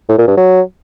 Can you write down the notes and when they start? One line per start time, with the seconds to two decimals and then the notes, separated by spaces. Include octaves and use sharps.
0.09 A2
0.18 A#2
0.28 G2
0.37 F#3